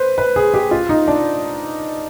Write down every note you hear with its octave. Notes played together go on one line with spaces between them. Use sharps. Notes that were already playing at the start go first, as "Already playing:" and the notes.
Already playing: B4 C5
B4
G#4
G4
F4
D#4
D4